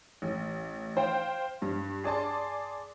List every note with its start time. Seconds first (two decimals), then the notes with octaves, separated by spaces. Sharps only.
0.22 A1
0.97 C5 F5 G5
1.62 G2
2.04 G#4 D5 A5 C6